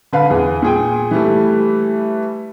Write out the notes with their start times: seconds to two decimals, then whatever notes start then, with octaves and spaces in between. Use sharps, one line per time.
0.13 D3 B4 F5
0.30 E2 G#4
0.62 A#2 G#4 G5
1.11 E3 G3 A3